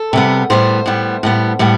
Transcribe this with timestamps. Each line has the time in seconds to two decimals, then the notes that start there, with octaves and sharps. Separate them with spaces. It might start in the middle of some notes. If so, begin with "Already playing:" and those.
Already playing: A4
0.13 C3 G3 B3
0.50 A2 G3 B3 C5
0.86 A2 G3 B3
1.23 A2 G3 B3
1.59 A2 G3 B3